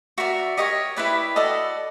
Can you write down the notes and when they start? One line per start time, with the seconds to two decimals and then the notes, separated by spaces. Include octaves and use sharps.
0.18 F#4 A#4 D5 E5
0.57 G4 A#4 C#5 D#5
0.96 E4 G4 B4 D5 E5
1.36 F#4 A4 D5 D#5